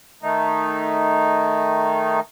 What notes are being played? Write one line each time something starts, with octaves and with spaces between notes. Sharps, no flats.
D#3 A3 D#4